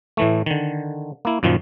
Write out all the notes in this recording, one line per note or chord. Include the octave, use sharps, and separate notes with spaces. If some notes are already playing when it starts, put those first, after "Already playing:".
A2 E3 A3
D3 D#3
A#3 E4
F#2 A#2 D#3 F3